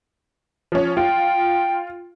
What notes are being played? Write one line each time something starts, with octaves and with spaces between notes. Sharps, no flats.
F3 C#4
F4 G5